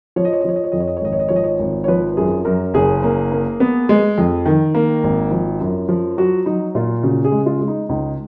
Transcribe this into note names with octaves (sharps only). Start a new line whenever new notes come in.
F3 C#5
D#5
C#5
D#5
F3 C#5
D#5
C#5
F2 D#5
C#5
D#5
C#5
G#1 D#5
C#5
D#5
F3 C#5
D#5
C#5
G#1
C#5
F3 B4
F#2 G#4
F#2 A#4
F#1 G#4
A#3
A#3
B3
G#3
F2
D#3
A#3
G#1
F3
F#2
F3
F#3 F#4
F#3 D#4
A#2 F4
C#3 F#4
G#4
G#3
F4
G#3
D#4
C#2 D#4